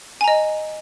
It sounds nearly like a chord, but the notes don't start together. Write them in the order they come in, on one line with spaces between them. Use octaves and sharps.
G#5 A#5 D#5